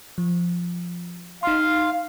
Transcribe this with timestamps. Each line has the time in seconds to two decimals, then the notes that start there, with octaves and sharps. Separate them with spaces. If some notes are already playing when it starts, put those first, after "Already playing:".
0.18 F3
1.43 D#4 F5 C6